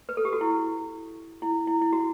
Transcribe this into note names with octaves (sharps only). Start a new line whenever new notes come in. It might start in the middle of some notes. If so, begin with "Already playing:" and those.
B4
A4
G4
F#4
E4
E4
E4
E4
F#4